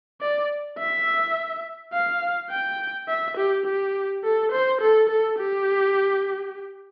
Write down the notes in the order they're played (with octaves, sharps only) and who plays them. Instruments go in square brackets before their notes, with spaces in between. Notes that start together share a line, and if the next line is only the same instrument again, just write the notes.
[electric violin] D5
E5
F5
G5
E5
G4
G4
A4
C5
A4
A4
G4